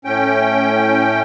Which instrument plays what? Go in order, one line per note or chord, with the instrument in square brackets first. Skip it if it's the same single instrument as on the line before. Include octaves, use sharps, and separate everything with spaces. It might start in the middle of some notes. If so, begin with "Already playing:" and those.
[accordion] A2 C#4 G5